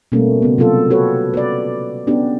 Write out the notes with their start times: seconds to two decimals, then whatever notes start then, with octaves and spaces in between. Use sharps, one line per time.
0.12 B2 G3 A3 A#3 C#4
0.42 C#3 B3
0.58 C3 F#3 F4 A4
0.90 F#4 G4 A4 B4 C#5
1.34 B4 D5
2.07 B3 C#4 D4 G4